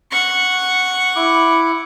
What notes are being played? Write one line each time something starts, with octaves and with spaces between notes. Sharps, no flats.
F#5 C#6
E4 D6